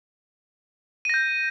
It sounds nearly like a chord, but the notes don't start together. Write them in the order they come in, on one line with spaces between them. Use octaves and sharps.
D#7 A#6 G6